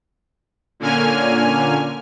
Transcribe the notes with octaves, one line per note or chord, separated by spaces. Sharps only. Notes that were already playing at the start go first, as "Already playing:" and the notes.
A#2 D3 A#3 C#4 G#5 F6